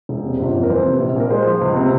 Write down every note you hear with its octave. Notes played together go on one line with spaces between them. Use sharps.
E1
C3
G1
F2
A#4
E3 C5
C3
A#1
A#2 A#4
G#3 C5
F3
C#2
C3